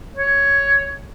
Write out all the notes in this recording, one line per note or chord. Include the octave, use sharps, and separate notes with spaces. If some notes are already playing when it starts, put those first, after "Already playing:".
C#5